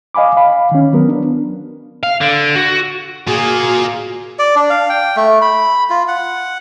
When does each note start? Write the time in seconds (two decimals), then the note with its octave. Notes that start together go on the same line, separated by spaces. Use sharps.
0.15 D#5 F5 G#5 B5 D6
0.37 F5 B5
0.72 D#3 C#4
0.93 F#3 B3 A#4
1.09 D4
2.03 F5
2.21 D3
2.55 F#4
3.27 A#3 F4 F#4 G#4
4.39 D5
4.56 D4
4.70 F5
4.89 G5
5.17 A3
5.41 B5
5.90 F4
6.08 F#5